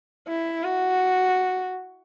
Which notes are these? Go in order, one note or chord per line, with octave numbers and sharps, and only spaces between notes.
E4
F#4